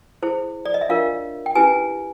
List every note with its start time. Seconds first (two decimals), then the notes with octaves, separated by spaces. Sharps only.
0.23 E4 G#4 C5
0.66 D5
0.74 D#5
0.81 E5
0.89 D4 F4 A#4 C#5 F5
1.46 G5
1.55 C#4 E4 G4 B4 G#5